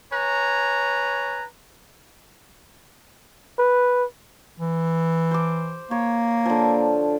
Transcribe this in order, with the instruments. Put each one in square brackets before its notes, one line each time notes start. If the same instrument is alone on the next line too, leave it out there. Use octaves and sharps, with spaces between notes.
[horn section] B4 C#5 G#5 A#5
[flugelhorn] B4
[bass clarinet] E3
[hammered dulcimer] C5 D6
[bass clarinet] A#3 [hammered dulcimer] C#5
[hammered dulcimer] D3 F3